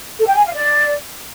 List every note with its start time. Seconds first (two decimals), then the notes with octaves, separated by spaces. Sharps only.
0.19 A4
0.28 G5
0.37 G#5
0.46 F5
0.54 D5